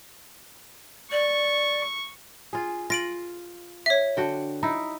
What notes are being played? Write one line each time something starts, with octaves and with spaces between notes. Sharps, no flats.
D5 C#6
F4 G#4
F4 A#6 D7 F#7
C#5 E5
D3 F#4 G5
D#4 E4